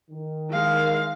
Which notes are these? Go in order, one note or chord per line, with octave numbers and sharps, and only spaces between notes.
D#3
G#3 F5